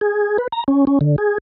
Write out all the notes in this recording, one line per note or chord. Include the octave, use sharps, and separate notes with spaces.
G#4
B4
A#5
C#4
C#4
D3
G#4